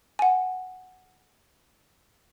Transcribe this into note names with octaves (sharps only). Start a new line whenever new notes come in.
F#5 G#5